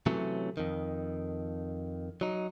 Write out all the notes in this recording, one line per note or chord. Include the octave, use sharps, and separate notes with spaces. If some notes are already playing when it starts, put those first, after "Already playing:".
C3 E3 F#3 A3 C#4
F2 D#3
F#3 D#4